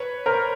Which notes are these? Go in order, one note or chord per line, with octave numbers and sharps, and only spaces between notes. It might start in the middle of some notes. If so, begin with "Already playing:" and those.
Already playing: B4 C#5
A#4 C5